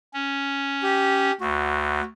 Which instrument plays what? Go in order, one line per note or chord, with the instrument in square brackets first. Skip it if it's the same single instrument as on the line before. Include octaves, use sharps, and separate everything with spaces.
[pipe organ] C#4
[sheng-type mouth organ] G4
[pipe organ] D2 [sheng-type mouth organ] F#4